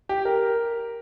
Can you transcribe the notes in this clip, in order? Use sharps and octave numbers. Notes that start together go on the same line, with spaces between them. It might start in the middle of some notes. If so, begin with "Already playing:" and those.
G4
A#4